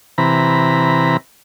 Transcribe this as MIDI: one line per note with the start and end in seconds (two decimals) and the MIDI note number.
0.18 1.17 48
0.18 1.17 52
0.18 1.17 82
0.18 1.17 83